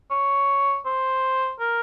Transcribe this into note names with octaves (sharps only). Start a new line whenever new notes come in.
C#5
C5
A#4